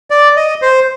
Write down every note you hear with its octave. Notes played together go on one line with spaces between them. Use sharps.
D5
D#5
C5